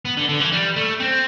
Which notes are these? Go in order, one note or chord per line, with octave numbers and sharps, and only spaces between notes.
B3
D3
D3
E3
G3
A3
C4